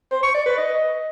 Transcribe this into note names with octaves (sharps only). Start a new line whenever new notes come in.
C5
C#6
D5
B4
D#5